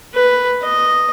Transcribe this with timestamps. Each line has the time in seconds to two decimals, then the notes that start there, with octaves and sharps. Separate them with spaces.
0.14 B4
0.63 D#5